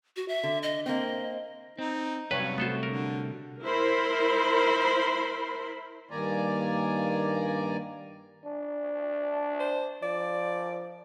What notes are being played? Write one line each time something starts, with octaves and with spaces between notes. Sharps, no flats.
F#4
E5
D3
D#5
A#3 C4 D#5
C4 D#4
G2 C3 F#3 G3 B4 C#5 F5
A3 B3 F#4 A4 C5
D3 A#4
E4 A#4 C5 B5 C6
G2 D#3 A#3 D5 G#5 A#5
D4
C5
F3 D5